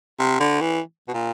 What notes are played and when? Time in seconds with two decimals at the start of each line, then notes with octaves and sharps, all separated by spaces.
0.19 C3
0.40 D3
0.61 E3
1.08 B2
1.14 A#2